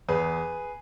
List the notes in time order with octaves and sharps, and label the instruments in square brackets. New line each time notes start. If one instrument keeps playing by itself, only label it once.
[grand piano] E2 G#4 B4